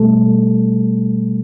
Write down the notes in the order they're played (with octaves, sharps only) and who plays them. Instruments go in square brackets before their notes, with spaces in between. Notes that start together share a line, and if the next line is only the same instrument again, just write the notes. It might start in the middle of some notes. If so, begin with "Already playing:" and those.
Already playing: [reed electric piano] B2 G3 A3 A4